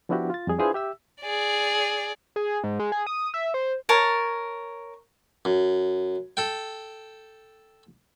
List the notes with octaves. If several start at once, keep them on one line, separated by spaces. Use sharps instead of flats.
F3 B3 D4 E4 F#4 G4
F4 A6
F2 G3 G#4
D4 E4 F4 G#4 B4 C5
G4 E5 E6
G#4 D5
G#4
G#2
G#3
G#4
D#6
E5
C5
A#4 C#5 A5
F#2
A4 G5